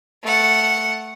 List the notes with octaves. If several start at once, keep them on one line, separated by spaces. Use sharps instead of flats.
A3 F#5